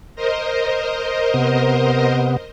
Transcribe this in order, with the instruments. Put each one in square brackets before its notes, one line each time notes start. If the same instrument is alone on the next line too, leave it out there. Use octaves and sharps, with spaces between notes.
[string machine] A#4 C5 D#5
[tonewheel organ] C3 B3